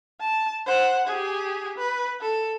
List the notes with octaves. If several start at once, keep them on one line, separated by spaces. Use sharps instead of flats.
A5
C5 F#5
G4 G#4
B4
A4